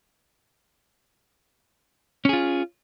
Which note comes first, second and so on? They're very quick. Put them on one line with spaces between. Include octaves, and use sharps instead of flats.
C#4 G#4 F4